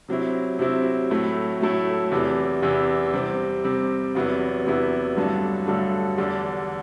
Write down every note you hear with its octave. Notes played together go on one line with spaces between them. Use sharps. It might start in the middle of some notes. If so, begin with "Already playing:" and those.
C3 F#3 C4 E4
C3 F#3 C4 E4
A2 F#3 A3 E4
A2 F#3 A3 E4
E2 C3 E3
E2 C3 E3
C3 G3 C4
C3 G3 C4
E2 C3 F#3 B3 E4
E2 C3 F#3 B3 E4
G2 D3 F#3 A3 D4
G2 D3 F#3 A3 D4
E2 D3 G3 D4